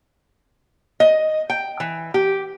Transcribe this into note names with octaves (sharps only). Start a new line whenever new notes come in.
D#5
G5
E3
G4